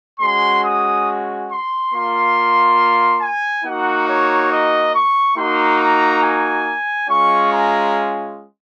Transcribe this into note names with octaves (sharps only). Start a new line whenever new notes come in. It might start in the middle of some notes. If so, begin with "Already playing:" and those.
G#3 C#4 F#4 C6
D#6
C6
A#3 F4 C6
G#5
A#3 D#4 F#4 F#5
C#5
D#5
C#6
A#3 D#4 F#4 C6
A#5
G#5
G#3 C#4 F4 C#6
A#5